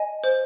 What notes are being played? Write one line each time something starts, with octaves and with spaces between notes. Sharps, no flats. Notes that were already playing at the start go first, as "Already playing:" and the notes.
Already playing: D#5 G#5
C5